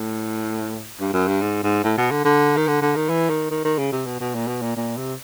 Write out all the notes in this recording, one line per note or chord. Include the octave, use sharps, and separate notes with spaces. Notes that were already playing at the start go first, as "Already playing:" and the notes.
Already playing: A2
G2
F#2
G2
G#2
G#2
A2
B2
D3
D3
D#3
D3
D3
D#3
E3
D#3
D#3
D#3
C#3
C3
B2
B2
A#2
B2
A#2
A#2
C3